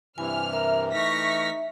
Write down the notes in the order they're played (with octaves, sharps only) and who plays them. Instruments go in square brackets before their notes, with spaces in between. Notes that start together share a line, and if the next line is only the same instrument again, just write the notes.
[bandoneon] G2 C3 E3 [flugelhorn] E4 [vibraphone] G#5 [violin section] F6
[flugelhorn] A#4 [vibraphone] E5
[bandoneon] E3 A3 F6 [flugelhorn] D#4 [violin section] C#6 A#6 B6